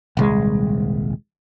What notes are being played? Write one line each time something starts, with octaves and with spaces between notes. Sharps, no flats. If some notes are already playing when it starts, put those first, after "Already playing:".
D#1 C2 G#3